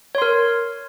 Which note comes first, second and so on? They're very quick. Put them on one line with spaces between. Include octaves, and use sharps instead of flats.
C#5 C6 A#4